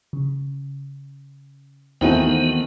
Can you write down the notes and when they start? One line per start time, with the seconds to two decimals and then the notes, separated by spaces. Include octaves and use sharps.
0.13 C#3
2.01 D#2 D#3 E3 A3 B3 C4 D#4 F#4